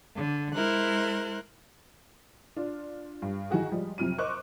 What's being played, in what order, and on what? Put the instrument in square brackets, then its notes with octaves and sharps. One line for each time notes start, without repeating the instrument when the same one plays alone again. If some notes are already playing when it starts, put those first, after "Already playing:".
[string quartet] D3
G#3 E4 A#4 C5 F#6
[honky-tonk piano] D4 F4
G2
D#3 E3 F#4 G#4
F3 G3 G#3
F2 C3 F#3 F6 D#7
A#4 C5 D#5 C#6 D6 F#6